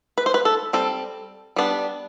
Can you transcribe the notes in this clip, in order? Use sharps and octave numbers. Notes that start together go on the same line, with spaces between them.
B4
C5
B4
A4
G3 C4 A4
G3 B3 D4